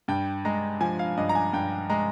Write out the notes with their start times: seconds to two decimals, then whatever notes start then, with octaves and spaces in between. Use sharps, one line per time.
0.08 G2 G5
0.45 G#3 A#5
0.81 F3 G#5
0.99 F5
1.17 G2 D#5
1.29 A#5
1.35 G#5
1.53 G2 G5
1.90 G#3 A#5